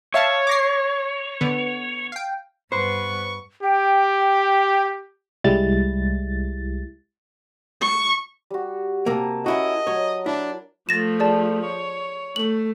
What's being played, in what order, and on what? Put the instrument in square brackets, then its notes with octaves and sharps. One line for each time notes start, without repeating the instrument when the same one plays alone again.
[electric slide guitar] C#5 [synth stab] E5 F5 A5
[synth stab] D6 A#6 C7
D3 B3
F5 G5
[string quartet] G2 B3 [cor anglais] B4 [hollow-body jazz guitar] C5 [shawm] C#6
[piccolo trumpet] G4 [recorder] G5
[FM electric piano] C2 G3 G#3 E4 A6
[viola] C#6
[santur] G3 F#4
[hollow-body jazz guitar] C3 A#3 [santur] A#4 G#5 A5
[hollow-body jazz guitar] C#4 E4 F#4 [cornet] D#5
[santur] F#3 [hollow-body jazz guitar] C#5
[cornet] D4 [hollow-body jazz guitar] E4
[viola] F3 A3 [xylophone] A6 A#6 E7
[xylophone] G#4 D5 A5
[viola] C#5
[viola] A3 [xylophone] F#7